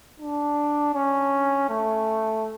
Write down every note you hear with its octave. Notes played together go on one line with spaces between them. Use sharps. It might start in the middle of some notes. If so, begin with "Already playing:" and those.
D4
C#4
A3